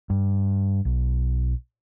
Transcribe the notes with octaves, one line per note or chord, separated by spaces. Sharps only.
G2
B1